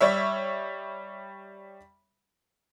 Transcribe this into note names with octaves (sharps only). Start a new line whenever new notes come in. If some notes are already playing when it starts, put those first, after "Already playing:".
G3 C#5 E5